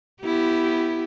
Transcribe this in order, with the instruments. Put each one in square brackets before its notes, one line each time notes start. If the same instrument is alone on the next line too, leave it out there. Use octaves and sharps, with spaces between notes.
[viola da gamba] B3 E4 G4